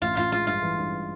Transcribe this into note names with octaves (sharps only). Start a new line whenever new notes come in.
A1 F4
A1 F4
G#3 F4
G2 F4
E3
G2